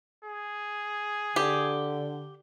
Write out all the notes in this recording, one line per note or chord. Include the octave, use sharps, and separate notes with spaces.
G#4
D3 G4